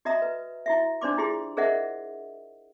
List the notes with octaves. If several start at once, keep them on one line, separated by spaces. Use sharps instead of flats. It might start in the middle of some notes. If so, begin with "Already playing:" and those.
F#4 D#5 E5 A#5 D#6
B4
E4 F#4 E5
D4 C5 D5 C6 D6
E4 F4 G4 G#4 C6
G#4 A#4 C5 D#5 E5 F#5